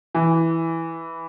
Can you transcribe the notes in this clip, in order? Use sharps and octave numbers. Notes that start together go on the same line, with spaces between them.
E3